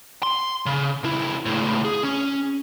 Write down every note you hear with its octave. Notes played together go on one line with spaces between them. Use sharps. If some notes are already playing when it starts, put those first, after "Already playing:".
C6
C#3
C#2 E4
C#2 A2
G#4
C#4